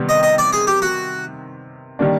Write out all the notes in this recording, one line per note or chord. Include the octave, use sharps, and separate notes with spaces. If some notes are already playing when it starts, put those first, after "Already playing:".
Already playing: C3 D#3 G3 B3
D#5
D#5
D5
G#4
G4
F#4
D#3 G3 A#3 D4